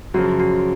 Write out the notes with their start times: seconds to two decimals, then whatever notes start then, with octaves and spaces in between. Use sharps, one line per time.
0.14 F#2 C#3 F3 F#4
0.40 F#4